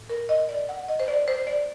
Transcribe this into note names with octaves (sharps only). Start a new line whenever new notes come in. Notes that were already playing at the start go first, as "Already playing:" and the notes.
Already playing: A2
A#4
D#5
D5
F#5
D#5
C5
D5
C5
D5